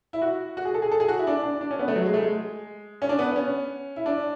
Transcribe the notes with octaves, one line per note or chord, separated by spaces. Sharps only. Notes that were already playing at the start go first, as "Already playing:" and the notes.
E4
F#4
F#4
G#4
A4
G#4
A4
G#4
F#4
E4
D4
D4
D4
C#4
B3
A3
F#3
G#3
A3
G#3
C#4
D4
B3
B3
C#4
E4
D4